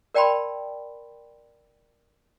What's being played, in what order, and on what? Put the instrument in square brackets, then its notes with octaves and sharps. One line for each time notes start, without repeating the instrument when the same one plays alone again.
[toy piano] A#4 D5 G5 A5 B5 C6